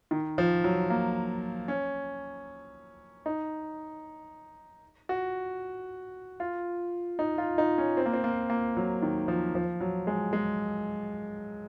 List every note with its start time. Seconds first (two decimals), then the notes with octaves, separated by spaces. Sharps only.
0.11 D#3
0.38 F3
0.64 F#3
0.90 A#3
1.68 C#4
3.26 D#4
5.09 F#4
6.40 F4
7.19 D#4
7.38 F4
7.58 D#4
7.78 C#4
7.97 C4
8.06 A#3
8.14 C4
8.24 A#3
8.50 A#3
8.77 F#3
9.02 D#3
9.28 F3
9.55 F3
9.81 F#3
10.07 G#3
10.33 G#3